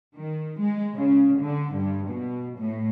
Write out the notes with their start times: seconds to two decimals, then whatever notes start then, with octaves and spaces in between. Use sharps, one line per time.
0.17 D#3
0.60 G#3
0.95 C#3
1.41 D3
1.75 G2
2.08 B2
2.59 A2